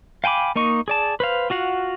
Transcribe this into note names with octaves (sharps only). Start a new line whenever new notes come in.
F5 G5 G#5 B5 D6
A#3 D#4 D#5 C#6
G#4 D5 A5
B4 C5 F5
F4 F#4 F5 F#5